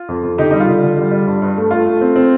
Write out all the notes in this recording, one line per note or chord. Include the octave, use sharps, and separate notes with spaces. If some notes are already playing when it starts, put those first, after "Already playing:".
Already playing: F4
F2
F2
D3 D#4 G4
G3 D#4
F4
D3
D3
G3
G3
G2
G2
A3
A3 F4
A3
C4
C4